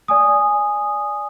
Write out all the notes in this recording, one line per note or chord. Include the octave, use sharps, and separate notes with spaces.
D5 G#5 D#6